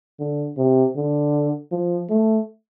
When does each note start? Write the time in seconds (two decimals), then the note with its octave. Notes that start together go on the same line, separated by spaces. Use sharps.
0.19 D3
0.57 C3
0.96 D3
1.71 F3
2.10 A3